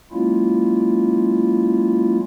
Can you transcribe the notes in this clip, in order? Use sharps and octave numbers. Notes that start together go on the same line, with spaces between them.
F#3 G#3 A#3 C#4 E4 F4